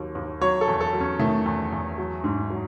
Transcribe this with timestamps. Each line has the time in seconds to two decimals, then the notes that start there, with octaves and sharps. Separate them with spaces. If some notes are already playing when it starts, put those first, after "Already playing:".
Already playing: D#2 F#3
0.15 D#2
0.41 F#3 C#5
0.61 A4
0.68 E2
0.80 A4
0.93 F#3
1.00 C#4
1.19 D#3 A3
1.46 E2
1.72 E2
1.98 F#3
2.24 G#2
2.50 F#3